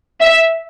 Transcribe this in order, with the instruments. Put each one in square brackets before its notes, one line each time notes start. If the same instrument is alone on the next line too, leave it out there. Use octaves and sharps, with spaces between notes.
[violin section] E5